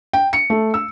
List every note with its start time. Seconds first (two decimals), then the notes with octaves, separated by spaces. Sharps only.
0.13 G5
0.33 C#7
0.50 A3
0.74 E6